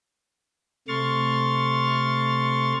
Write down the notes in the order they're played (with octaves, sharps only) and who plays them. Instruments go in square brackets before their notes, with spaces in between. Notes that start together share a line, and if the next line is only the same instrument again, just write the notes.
[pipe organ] C3 A3 C6 C#6 F6 A6